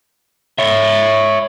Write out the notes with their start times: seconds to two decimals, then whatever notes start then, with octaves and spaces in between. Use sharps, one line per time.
0.58 C#5 E5